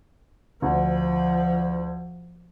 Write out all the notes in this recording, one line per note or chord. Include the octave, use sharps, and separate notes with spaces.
D2 F3